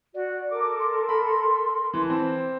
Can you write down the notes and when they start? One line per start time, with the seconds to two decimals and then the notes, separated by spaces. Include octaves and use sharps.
0.14 F#4 D5
0.50 A4 A#4 D6
0.80 C6
1.09 B5
1.93 E3 A5
2.10 C4